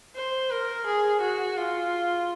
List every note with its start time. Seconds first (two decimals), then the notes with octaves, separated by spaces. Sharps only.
0.15 C5
0.51 A#4
0.86 G#4
1.21 F#4
1.57 F4